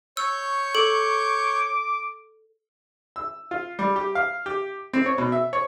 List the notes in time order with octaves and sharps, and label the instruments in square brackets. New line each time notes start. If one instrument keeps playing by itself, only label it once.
[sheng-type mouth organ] C#5 C#6 G6 [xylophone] E6
[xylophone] A4 [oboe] D6
[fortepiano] E6
F4
G3
G4
F5
G4
C4
C#5
B2
E5
C#5